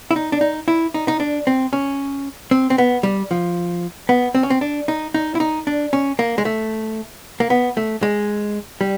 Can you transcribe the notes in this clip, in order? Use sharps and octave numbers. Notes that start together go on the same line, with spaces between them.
E4
D#4
D4
D#4
E4
D#4
D#4
D4
C4
C#4
C4
C4
B3
G3
F3
B3
C4
C#4
C4
D4
D#4
D#4
E4
D#4
D4
C#4
A#3
G#3
A3
A#3
B3
A3
G#3
G3